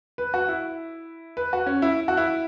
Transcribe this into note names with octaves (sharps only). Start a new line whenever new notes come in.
B4
F#4
E4
B4
F#4
C#4
E4
F#4
E4